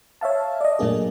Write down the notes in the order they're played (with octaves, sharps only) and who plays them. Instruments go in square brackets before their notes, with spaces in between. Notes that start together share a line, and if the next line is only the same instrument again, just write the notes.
[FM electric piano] C#5 E5 F5 A5
D5 D#5
A#2 F#3 A3 A#3 D4 G#4